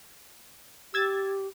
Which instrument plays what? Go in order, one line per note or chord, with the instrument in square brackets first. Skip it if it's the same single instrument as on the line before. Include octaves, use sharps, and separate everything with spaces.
[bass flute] G4 [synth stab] E6 G#6 A6